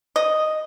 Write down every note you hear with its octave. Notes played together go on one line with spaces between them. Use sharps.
D#5